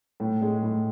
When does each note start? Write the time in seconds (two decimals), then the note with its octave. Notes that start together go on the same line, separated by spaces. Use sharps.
0.20 A2
0.42 G#3
0.62 A2